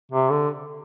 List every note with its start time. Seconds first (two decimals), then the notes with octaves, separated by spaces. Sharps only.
0.12 C3
0.30 D3